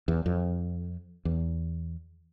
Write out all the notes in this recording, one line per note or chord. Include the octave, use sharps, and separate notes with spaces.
E2
F2
E2